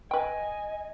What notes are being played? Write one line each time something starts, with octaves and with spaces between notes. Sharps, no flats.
B4 D#5 G5 G#5